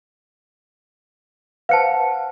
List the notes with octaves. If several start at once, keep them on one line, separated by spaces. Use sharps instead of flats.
B4 C5 F5 F#5 A5 C#7